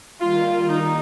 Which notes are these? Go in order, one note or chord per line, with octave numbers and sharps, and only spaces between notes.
D#3 G3 A#3 F4
D#4